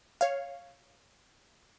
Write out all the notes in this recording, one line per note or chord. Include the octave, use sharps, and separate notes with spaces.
C#5 F5